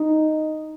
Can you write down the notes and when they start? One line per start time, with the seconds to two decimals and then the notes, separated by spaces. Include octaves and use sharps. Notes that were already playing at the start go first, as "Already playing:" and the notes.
Already playing: D#4